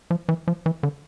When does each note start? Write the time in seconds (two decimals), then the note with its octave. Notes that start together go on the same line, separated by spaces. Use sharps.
0.11 F3
0.29 E3
0.48 F3
0.66 E3
0.83 D3